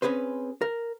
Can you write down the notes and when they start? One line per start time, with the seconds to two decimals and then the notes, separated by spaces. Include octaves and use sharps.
0.02 C4 C#4 G#4 B4 C5
0.61 A#4